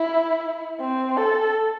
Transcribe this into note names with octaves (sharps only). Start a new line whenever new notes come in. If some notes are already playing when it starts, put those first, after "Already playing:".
Already playing: E4
C4
A4